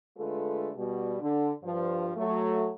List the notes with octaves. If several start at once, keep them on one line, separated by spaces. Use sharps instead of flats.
D3 G#3 A3 F4 A4 B4
B2 G3
D3
G2 F3
F#3 A3